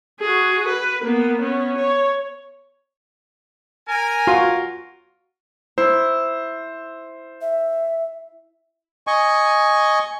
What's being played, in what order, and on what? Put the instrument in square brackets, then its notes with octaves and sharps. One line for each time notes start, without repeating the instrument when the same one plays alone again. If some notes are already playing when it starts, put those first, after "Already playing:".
[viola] F#4 G#4
B4
A#3 B3
B3 C#4
C#5
[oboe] A#4 [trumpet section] G#5
[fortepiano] F4 [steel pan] F#4
[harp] E4 [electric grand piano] C5
[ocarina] E5
[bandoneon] D#5 G#5 C#6